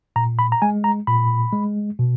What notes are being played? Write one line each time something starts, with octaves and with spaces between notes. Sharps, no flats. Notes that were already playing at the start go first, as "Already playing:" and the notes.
A#2 A#5
B5
A#5
G#3 G#5
A#5
A#2 B5
G#3
B2